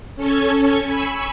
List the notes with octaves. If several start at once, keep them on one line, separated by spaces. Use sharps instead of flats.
C#4 A4 C#6 G#6
G#5 B5 C#6 E6